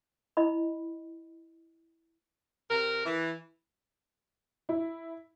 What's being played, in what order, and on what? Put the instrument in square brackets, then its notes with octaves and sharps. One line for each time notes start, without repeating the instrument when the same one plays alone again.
[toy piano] E4 D#5 B5
[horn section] C3 A#4
E3
[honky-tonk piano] E4